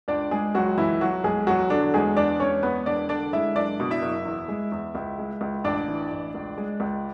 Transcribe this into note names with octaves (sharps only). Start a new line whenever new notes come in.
C#2 D4 D5
G#3 G#4
C#2 F#3 F#4
B1 E3 E4
F#3 F#4
B1 G#3 G#4
E2 F#3 F#4
D3 F#3 D4
E2 G#3 G#4
E2 D4 D5
G#3 C#4 C#5
E2 B3 B4
E1 D4 D5
D3 D4 D5
G#3 E4 E5
F#1 D4 D5
B2
E4 E5
F#1
E2
G#3
E2
C#2
G#3
C#2
A1 D4 D5
E3
A1
C#2
G#3
C#2